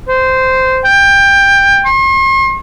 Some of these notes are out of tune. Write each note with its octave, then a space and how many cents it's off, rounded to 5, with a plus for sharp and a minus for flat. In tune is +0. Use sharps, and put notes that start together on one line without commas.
C5 -10
G5 +20
C6 +45